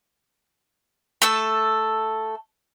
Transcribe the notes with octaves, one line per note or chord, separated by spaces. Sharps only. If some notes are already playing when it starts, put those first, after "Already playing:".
A3 A4 E6